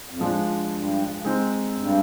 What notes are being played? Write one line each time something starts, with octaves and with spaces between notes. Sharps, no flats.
F2
G2 F3 G#3 D4 F4
G#2
G2
G2
G2
G#3 C4 D#4
F2
G2